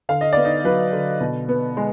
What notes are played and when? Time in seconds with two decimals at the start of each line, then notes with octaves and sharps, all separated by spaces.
0.09 D3 F5
0.21 D#5
0.33 B3 D5
0.45 D#4 D#5
0.65 F#3 B4
0.93 D3
1.21 B2
1.49 B3
1.77 G#3